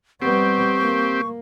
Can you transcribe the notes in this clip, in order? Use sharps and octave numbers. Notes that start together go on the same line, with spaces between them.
G3 B3 C4 G4 C#6
A#3